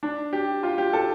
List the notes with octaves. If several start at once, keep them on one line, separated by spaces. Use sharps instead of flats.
D4
G4
F4
G4
A4